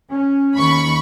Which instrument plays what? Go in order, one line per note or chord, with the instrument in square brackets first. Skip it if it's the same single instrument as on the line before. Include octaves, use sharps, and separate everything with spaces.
[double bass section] C#4
[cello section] D#2 [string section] B5 C#6